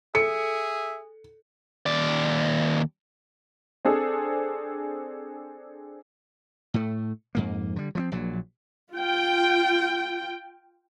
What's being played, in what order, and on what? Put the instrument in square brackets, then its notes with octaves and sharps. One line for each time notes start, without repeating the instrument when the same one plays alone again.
[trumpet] G#4 [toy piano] A4 [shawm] E5 [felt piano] C#7
[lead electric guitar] D#2 D5
[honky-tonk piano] C4 D4 G#4 A4
[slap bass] A2 A3
F2 G#2 A#3
D3 G3
F3 G#3 C4
A#1 A#2 F#3
[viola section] F4 G5